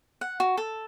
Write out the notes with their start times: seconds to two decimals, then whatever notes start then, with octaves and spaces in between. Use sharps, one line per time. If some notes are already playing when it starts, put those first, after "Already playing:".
0.21 F#5
0.40 F#4
0.57 A4